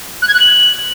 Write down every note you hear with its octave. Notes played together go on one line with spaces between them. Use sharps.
F#6
G#6
F#6
F#7